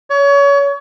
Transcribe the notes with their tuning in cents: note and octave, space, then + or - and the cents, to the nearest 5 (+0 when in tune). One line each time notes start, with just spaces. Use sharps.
C#5 +30